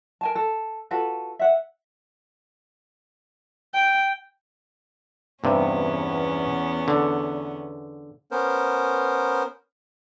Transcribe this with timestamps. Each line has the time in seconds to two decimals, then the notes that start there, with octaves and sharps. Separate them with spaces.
0.21 A#4 G#5 A5
0.35 A4
0.91 F4 F#4 A4 B4
1.39 E5 F#5
3.74 G5
5.44 E2 G2 C3 B3 C#4
6.88 D3
8.31 B3 C#4 A#4 C5